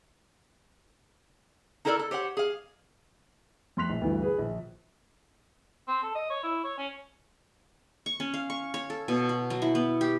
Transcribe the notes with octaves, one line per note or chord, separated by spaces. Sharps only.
D#4 E4 A4 A#4 C5 D5
A4
G4 C5 C#5 F#5
G#4 F5
F2 A3 C6 F#6 B6 F7
A#1
D2 G2 E3
G#4 B4
A#1
C4
A4
D#5
C#5
E4
C#5
C#4
C#6
C#4
F5
C#6
C#5
A4
B2
F#4
F#3
E4
B3
G4